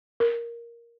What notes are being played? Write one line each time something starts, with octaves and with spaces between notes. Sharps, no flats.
A#4